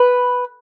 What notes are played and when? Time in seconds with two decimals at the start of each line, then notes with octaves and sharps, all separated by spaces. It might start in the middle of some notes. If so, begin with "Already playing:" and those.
Already playing: B4